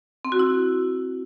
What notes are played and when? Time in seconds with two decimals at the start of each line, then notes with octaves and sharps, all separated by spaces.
0.25 C4
0.32 F#4
0.39 E4